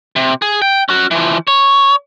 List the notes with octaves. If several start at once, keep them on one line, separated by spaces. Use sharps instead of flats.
C3
G#4
G5
C#4 F#4
E3 F3
C#5